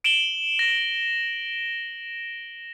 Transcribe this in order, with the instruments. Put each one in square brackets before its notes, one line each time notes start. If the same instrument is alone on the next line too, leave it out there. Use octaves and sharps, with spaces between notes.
[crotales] D7 E7 F#7 G7
A#6